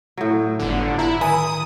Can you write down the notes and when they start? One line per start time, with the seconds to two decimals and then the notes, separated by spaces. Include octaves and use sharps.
0.17 A2 F#3
0.59 G1 D3
0.98 E4 A#5
1.21 D#3 G#5 A#5 D#6